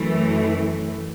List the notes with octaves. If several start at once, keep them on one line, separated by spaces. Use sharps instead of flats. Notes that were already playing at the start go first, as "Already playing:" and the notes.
Already playing: F#2 E3 A3